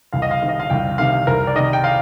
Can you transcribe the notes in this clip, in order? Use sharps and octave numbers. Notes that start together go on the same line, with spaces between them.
C2 F5
D#5
F5
C3 D#3
D#5
F5
C2 G5
C3 D#3 F5
C2 A#4
D5
C3 D#3 D#5
G5
F5